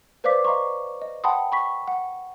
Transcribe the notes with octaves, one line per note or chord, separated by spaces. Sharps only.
B4 C5 D5 F5 D6 B6
D#5 F5 A#5 C6 C#6
D#5
F#5 G5 A5 B5 C6 D#6
B5 C#6 B6
F#5